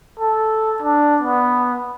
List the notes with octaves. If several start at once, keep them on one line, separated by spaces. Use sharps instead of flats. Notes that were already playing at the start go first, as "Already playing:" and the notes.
A4
D4
B3